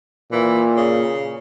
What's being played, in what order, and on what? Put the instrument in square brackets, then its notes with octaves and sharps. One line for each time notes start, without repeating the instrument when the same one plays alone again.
[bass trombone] A#2 [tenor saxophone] E3
[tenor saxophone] C#3